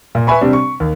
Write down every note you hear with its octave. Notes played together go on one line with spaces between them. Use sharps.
A#2
B4 E5 G#5 B5 C#6
C3 G3 C4 D4
C#6
D#2